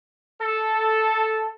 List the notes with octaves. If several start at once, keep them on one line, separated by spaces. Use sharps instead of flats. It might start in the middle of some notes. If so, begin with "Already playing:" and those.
A4